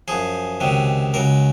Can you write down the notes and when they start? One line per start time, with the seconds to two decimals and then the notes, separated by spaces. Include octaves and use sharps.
0.08 F#2 F3 G#4
0.60 C#2 C3 D#3 F#3
1.14 C#2 C#3 F#3 A#4